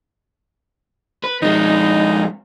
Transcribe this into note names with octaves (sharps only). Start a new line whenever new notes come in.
B4
F2 G#3 D#4